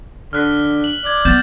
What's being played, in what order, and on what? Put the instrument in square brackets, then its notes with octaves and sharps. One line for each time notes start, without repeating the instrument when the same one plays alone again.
[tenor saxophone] D3 [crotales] F6 F#6 B6
[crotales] F#7
[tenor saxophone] D5 [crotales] G#6 F#7
[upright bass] B3 [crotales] G6 A6 E7